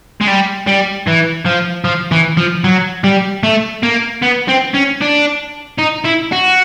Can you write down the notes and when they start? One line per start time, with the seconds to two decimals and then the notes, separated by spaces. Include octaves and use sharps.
0.21 G#3
0.27 G3
0.67 G3
1.07 E3
1.45 F3
1.85 F3
2.12 E3
2.37 F3
2.64 F#3
3.04 G3
3.43 A3
3.83 A#3
4.22 B3
4.48 C4
4.74 C#4
5.01 D4
5.79 D#4
6.05 E4
6.33 F#4